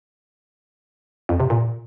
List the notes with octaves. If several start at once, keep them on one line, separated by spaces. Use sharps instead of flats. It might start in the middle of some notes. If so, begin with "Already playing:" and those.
F2
C3
A#2